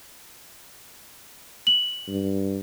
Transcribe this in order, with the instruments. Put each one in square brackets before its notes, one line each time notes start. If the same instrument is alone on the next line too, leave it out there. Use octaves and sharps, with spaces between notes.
[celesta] F#7
[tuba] G2